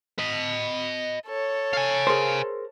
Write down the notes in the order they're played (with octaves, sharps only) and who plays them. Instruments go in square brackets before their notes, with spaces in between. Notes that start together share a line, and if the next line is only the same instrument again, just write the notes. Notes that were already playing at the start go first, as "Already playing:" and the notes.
[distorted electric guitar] D#5 B5
[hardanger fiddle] A4 C#5
[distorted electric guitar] F5 G#5
[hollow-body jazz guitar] G#4 A#4 C5